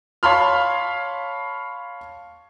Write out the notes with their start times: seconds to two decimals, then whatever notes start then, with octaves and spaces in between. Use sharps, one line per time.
0.23 C#5 F5 A5 B5 C6 F6